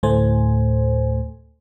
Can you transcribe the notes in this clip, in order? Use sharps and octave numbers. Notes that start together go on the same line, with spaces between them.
D2 A2 A3 C5 G#5